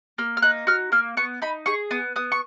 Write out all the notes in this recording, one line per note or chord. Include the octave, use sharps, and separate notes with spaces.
A#3 F6
F6
D#4 F#6
F#4 F6
A#3 F6
B3 C#6
D#4 B5
G#4 C#6
B3 D#6
B3 D#6
C#6